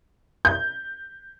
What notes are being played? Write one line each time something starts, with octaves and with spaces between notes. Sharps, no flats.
G6